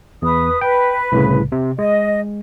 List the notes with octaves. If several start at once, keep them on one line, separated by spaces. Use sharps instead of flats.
E2 B4 D#6
B4 G5
C2 A2 C#3
C3
G#3 D#5